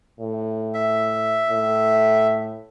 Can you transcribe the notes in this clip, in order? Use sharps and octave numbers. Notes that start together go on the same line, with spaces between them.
A2
E5
A2